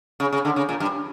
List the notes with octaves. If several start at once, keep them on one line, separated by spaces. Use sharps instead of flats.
C#3
C#3
D3
C#3
A#2
G2